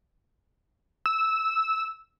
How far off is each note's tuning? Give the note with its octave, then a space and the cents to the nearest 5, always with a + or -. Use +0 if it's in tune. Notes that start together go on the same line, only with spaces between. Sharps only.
E6 -10